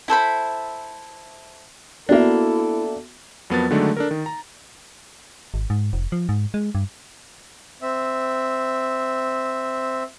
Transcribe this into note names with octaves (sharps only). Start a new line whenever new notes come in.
E4 A4 C5 B5
A#3 B3 D4 E4 F#4 A4 E5
F2 F#3 B3 A#4 A5 A6
D3 D#3 F#3 G#3 A3 D4
D4 A4 A#4
D#3
A#5
G#1
G#2
F1
F3
G#2
G#3
G2
C4 E5